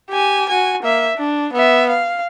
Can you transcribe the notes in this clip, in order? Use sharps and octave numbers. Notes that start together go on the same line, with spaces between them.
G4 G#5
F#4 G#5
A#3 E5
D4
B3 E5
F5